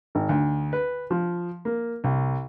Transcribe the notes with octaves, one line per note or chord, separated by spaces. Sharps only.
G#1
D2
B4
F3
A#3
C2